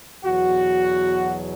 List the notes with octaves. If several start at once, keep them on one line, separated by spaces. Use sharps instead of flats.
E2 B2 F#3 F#4